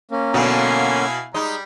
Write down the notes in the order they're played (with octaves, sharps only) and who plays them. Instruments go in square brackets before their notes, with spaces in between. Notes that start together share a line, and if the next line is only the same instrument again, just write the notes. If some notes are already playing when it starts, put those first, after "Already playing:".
[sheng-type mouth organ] A#3 C#4
[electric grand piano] B2 [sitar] D3 F#3 [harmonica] E4 F5 G#5
[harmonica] G3 [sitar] G#3 D#4